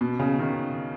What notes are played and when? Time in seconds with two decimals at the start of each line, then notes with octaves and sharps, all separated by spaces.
0.01 B2
0.20 C#3
0.39 D#3